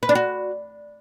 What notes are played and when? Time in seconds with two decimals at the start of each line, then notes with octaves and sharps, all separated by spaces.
0.03 B4
0.09 D4
0.15 F#4